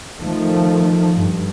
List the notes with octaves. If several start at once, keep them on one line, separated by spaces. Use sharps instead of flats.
D#3 F3 A3
G2